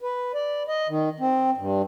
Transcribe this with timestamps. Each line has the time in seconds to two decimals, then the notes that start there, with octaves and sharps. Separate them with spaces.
0.01 B4
0.34 D5
0.68 D#5
0.89 D#3
1.20 C4
1.57 G2